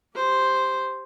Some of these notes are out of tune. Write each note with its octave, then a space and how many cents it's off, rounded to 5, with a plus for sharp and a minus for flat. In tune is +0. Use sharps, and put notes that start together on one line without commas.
G4 -5 C5 +0